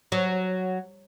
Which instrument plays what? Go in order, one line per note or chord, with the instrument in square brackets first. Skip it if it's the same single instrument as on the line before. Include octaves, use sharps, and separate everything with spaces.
[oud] F#3